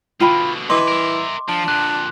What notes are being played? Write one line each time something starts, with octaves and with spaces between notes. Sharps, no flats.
B2 D3 F4 G5 B5
E3 D#5 C6 D6
A#4 E5
F3 D4
F2 A#2 F#6